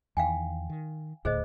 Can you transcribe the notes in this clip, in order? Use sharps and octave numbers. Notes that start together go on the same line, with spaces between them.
E2 D#3 F5 G5 G#5
D#3
D#1 D2 A2 G#4 C5 D#5